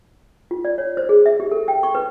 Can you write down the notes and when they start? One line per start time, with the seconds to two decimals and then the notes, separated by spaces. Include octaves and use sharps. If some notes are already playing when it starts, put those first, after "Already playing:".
0.51 F4
0.65 D5
0.78 C#5
0.97 C5
1.09 G#4
1.26 E5
1.40 G4
1.52 A4
1.68 G5
1.83 C#6
1.95 B4